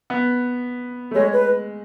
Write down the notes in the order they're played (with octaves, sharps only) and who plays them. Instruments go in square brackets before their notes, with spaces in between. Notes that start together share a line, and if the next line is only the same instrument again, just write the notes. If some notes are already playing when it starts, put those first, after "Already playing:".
[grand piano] B3
A3
[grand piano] G#3 [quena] C#5
[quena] B4